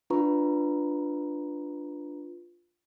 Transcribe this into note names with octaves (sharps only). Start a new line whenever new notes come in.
D4 F4 B4 A#5 C#6